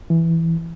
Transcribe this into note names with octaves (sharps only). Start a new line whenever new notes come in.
E3